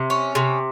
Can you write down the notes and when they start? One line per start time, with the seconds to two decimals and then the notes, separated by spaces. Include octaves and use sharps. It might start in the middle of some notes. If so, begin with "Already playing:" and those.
Already playing: C3
0.10 C#4
0.35 C3